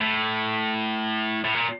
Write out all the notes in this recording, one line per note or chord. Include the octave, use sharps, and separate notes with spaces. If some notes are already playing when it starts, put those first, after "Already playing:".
A2
A2
A#2